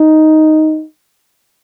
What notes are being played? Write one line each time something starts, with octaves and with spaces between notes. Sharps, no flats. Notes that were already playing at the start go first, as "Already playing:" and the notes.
Already playing: D#4